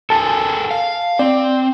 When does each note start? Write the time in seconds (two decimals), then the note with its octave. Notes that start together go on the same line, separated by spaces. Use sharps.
0.10 A4 A#4 G#5 A5
0.71 F5
1.19 C4 D5